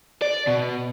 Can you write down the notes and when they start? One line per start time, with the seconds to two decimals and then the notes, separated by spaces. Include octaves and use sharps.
0.22 D5
0.47 B2